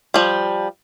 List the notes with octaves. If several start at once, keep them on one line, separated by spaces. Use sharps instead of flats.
F3 G3